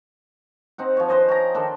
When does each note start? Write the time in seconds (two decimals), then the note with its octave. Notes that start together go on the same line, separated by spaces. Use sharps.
0.78 C4 D#4 F#5
0.97 F3 C#5
1.09 B4 C5 D#5 G#5
1.29 C#5 G5 A#5
1.55 D#3 D4 A4 C6